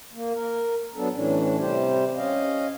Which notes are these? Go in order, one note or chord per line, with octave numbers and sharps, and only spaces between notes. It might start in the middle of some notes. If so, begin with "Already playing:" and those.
A#3
A#4
F#3 B3 D4 A4
A2 E3 C#4 D4
C3 G3 G4 C5
C#4 D#5 F5